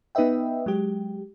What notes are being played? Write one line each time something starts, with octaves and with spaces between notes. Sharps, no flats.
B3 D#4 B4 D#5 E5 G5
F#3 G#3 G4